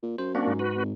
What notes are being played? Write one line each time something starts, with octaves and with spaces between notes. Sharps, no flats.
A#2
F#2 C5
A#3 C4 D4 F#4
G#2
F#4 B4
G#1